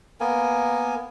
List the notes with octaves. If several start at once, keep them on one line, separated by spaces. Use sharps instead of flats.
A#3 B3 A#4 G#5